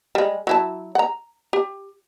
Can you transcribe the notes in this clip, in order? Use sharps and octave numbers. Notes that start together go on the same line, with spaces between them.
G3 G#3
F#3 E4 A5
F#5 A#5
G4